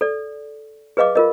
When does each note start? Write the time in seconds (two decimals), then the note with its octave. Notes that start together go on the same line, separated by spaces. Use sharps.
0.01 A4 D5
0.97 G#4 B4 D#5 F5 D6
1.15 F4 A#4 D#5